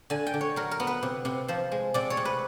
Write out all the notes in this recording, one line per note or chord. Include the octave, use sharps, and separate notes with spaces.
D3 G#5
G5
D3
C#5
F#3 A#4
A#4
B3
B4
C3
C3
F3 C5
G#3
C3 D5
C#5
C3
B4